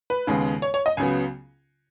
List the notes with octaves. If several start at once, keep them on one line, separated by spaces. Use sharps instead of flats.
B4
D#2 C#3 G#3 B3
C#5
C#5
D#5
C#2 C#3 F#3 B3 G#5